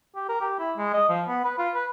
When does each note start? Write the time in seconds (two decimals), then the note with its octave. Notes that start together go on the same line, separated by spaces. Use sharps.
0.16 G4
0.29 A#4
0.41 G4
0.59 E4
0.78 G#3
0.94 D#5
1.09 F3
1.28 B3
1.44 B4
1.59 F4
1.74 B4